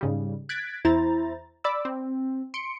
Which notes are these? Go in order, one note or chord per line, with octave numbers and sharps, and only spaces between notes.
G#2 C#3 G3
F#6 G#6 A6 B6 D7
E2 E4 C5 A#5 A6
D5 B5 D6 E6
C4
C6 C#7 D7